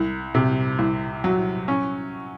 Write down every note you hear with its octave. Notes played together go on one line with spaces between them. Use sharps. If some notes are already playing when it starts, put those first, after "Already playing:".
Already playing: C2
C3
C2
F#3
C#4